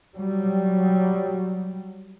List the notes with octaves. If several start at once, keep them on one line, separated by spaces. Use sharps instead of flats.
F#3 G3